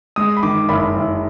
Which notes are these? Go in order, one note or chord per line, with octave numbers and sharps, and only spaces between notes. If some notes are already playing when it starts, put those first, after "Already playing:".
G#3 D#6
B5
D#3 D6
F#1 B5
F#1